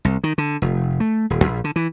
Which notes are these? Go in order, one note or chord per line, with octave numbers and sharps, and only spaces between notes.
C2
D#3
D3
F1
A3
D#1
A#1
D3
E3